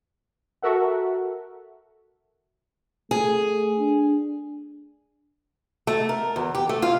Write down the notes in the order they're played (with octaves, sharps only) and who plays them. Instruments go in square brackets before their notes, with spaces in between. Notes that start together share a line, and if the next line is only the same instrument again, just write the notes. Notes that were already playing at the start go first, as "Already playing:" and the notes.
[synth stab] F#4 A4 A#4 E5 F#5
[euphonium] A3 [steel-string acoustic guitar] G#4
[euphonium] D4
[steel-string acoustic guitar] A3
A#4
E2
G4
A3
F4